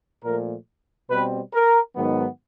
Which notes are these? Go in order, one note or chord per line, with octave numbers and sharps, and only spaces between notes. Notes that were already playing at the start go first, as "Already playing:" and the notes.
A#2 F3 A3 A#4
B2 G3 C4 B4
A#4
G#2 D#3 F#3 B3